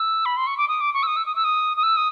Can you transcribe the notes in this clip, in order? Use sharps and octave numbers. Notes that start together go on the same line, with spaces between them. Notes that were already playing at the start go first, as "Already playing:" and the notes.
Already playing: E6
B5
C6
C#6
D6
D#6
D6
C#6
E6
D#6
E6
D#6
E6
D#6
D#6
E6
D#6